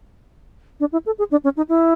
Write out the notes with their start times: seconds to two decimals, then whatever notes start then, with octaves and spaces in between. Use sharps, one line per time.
0.80 D4
0.92 E4
1.06 A4
1.18 G#4
1.31 D4
1.44 C#4
1.57 D#4
1.69 E4